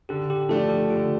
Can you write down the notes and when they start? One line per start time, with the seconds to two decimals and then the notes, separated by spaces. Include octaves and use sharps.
0.09 D3 G4
0.30 G4
0.49 F3 A3 D4 A4
0.70 G4
0.90 D3 F4